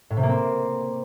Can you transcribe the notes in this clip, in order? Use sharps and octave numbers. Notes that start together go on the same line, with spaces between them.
A2
C3
A#3
C4